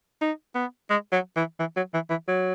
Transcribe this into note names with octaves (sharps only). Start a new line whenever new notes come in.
D#4
B3
G#3
F#3
E3
E3
F#3
E3
E3
F#3